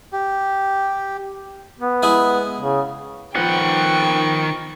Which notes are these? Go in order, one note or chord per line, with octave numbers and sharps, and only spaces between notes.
G4
B3
G#3 E4 G#4
C#3
D#3 F3 B3 F#5 G5 C#6